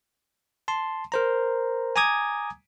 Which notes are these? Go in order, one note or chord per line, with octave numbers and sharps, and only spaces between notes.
A5 C6
A#4 C5 A#5
G#5 A#5 D6 D#6 G#6